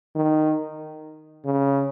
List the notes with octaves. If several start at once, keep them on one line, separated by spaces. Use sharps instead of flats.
D#3
C#3